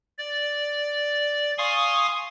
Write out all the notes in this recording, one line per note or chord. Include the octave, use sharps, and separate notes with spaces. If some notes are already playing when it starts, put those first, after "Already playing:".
D5
F5 G#5 C6 C#6 D#6